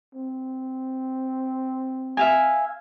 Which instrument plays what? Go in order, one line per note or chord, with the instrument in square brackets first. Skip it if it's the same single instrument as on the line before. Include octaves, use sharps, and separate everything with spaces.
[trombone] C4
[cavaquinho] E5 F5 G#5